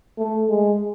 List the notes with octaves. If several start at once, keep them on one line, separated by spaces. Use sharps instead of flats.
A3
G#3